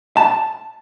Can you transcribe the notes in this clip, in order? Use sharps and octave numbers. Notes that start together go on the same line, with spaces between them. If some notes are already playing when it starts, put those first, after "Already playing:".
A5